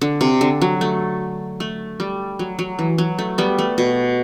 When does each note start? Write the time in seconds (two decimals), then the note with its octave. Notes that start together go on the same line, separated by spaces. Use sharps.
0.01 D3
0.21 C3
0.41 D3
0.62 F#3
0.81 A3
1.60 A3
2.00 G3
2.39 F#3
2.59 F#3
2.79 E3
2.98 F#3
3.19 A3
3.38 G3 B3
3.59 A3
3.78 B2